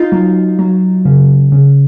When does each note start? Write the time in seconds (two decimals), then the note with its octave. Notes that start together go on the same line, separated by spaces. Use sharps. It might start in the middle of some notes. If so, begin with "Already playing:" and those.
Already playing: D#4 F4
0.12 F#3
0.59 F#3
1.05 C#3
1.52 C#3